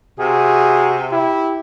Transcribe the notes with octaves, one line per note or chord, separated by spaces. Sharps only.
C3 F#4 G#4
E4 G4